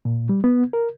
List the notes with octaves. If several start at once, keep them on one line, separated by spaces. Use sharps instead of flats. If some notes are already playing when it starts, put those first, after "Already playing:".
A#2
G3
B3
A#4